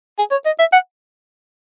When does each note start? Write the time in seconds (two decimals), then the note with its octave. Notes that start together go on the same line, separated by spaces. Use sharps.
0.18 G#4
0.31 C#5
0.46 D#5
0.59 E5
0.73 F#5